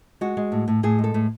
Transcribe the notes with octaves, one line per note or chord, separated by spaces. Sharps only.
G#3 F#4
G#3
A2
A2
A2 G#4
G#3
A4
A2